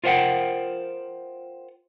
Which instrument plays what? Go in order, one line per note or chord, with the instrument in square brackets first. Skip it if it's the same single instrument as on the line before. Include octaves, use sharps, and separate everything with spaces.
[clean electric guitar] F4 A#4 C5 E5 F#5 G5